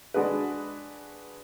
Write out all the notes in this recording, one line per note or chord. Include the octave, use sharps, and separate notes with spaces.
G#3 D4 F#4 G#4 B4